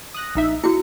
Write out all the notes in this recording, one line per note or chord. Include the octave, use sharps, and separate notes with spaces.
D#6 F#6 A#6
A#1 D#4 E5
E4 F#4 C#7